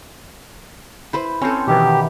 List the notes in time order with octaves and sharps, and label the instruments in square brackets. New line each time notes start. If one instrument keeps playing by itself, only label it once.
[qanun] E4 B4 C5
[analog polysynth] C4 [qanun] C#4 A4
[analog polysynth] B2 D#3 E3 [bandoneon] G4